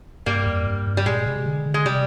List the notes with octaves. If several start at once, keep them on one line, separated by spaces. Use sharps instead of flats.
G2 G3 A#3
F2
G2
G2
G3
A#2 G#3
C3
C3
D3
D3
G#3
C3 G3